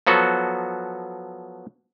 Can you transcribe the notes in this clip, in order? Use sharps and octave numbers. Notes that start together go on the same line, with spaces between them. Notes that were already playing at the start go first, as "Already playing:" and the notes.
F3 F#3 B3 F#4 A4